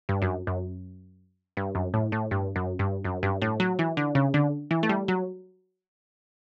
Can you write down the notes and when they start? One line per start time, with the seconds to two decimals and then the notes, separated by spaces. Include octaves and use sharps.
0.09 G2
0.22 F#2
0.47 F#2
1.57 G2
1.75 F#2
1.94 A2
2.12 A2
2.31 G2
2.56 F#2
2.79 G2
3.05 F#2
3.23 G2
3.42 A2
3.60 F#3
3.79 E3
3.97 D3
4.15 C#3
4.34 D3
4.71 E3
4.83 A3
4.89 G3
5.08 F#3